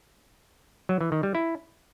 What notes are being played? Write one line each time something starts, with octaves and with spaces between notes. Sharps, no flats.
F#3
E3
D#3
G3
E4